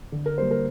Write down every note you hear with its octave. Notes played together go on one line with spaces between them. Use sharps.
D3
A#4
G3 A#3 C5
A#4